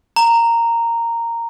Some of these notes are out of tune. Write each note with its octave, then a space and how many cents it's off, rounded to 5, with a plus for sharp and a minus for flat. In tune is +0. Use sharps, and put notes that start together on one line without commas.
A#5 -10